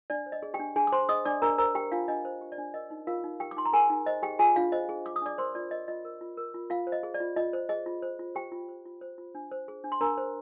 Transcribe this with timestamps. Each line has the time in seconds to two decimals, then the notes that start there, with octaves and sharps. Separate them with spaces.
0.10 D4 D5
0.26 C5
0.32 D#5
0.43 G#4
0.54 G4 G5
0.59 D4
0.76 D4 G#4 G#5
0.87 D6
0.92 C5 C6
1.09 G#4 D#5 D#6
1.25 D4 D5 D6
1.42 D4 A#4 A#5
1.58 A#4 C5 A#5
1.75 G4 G5
1.92 D4 F4 F5
2.08 D4 D#5
2.25 C5
2.41 G4
2.52 D5
2.58 D4
2.74 A#4 D#5
2.90 D#4
3.07 F4 A#4 F5
3.24 D#4
3.40 G4 A#4 G5
3.51 D6
3.56 D#4 C6
3.66 A#5
3.73 G#4 A#4 G#5
3.90 D#4
4.06 C5 D#5
4.23 G4 G#4 G5
4.39 F4 G#4 G#5
4.56 D4 F4 F5
4.72 C5 D#5
4.89 G#4
5.05 F4 D6
5.16 D#6
5.22 D4 D5 D6
5.38 A#4 C5 C6
5.55 F4 D5
5.71 A#4 D#5
5.88 F4 D#5
6.05 A#4
6.21 F4
6.37 A#4
6.54 F4
6.70 F4 F5
6.87 C5
6.92 D#5
7.03 G#4
7.14 D5
7.20 F4
7.36 F4 D#5
7.53 C5
7.69 G#4 D#5
7.86 F4
8.02 C5
8.19 F4
8.35 G4 C5 G5
8.52 F4
8.69 C5
8.86 F4
9.01 C5
9.18 F4
9.35 D4
9.51 C5
9.68 G#4
9.84 D4
9.92 C6
10.01 D4 A#4 A#5
10.18 C5